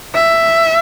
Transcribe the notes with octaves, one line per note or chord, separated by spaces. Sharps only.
E5